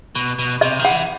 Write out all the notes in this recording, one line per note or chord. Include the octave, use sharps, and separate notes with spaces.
B2
B2
C3 D#5
D#3
E3 F#5